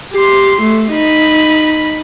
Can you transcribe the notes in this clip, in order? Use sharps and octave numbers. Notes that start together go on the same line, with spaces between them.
G4 C6
A3
D#4 B5